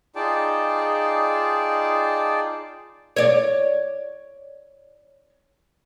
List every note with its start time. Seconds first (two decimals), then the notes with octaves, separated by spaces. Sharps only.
0.16 D#4 F4 G#4 D5 G5 A5
3.16 C#5 D5